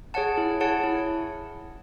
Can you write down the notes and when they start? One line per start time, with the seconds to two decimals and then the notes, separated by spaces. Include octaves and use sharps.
0.14 G#4 C#5 F#5 A5
0.38 E4
0.61 G#4 C#5 F#5 A5
0.84 E4